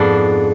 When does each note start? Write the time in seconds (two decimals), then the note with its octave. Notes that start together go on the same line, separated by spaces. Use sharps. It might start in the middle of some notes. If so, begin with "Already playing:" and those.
Already playing: F2 G#2 F3 B3 D4